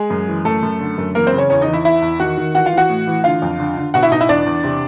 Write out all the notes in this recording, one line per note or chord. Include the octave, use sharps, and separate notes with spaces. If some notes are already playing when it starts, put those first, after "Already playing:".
Already playing: G#3 G#4
F#2
E3
F#2 A3 A4
F#2
D3
F#2
E3 A#3 A#4
C4 C5
C#3
C#4 C#5
E2 C#4 C#5
D#4 D#5
E3
E4 E5
E2 E4 E5
E2
D#3 F#4 F#5
D#3
E3 F#4 F#5
F4 F5
E3
F#4 F#5
A2
E3
D3 F4 F5
F2
D3
D3
B2 F#4 F#5
E4 E5
B2 D#4 D#5
E4 E5
E2 D4 D5
E2
C3